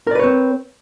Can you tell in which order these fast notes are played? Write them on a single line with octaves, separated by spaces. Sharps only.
A#4 D5 B4 C#5 C4